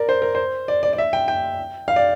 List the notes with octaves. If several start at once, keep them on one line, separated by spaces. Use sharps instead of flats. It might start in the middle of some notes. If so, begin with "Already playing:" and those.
Already playing: A#4 D5
C5
A#4
C5
D5
D5
D5
E5
G5
G5
F5
D5